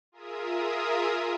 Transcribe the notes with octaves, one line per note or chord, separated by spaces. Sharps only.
F4 G#4 A#4 E5 D#6